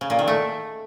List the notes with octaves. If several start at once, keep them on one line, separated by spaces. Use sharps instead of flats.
C#3
A#2
D#3
A3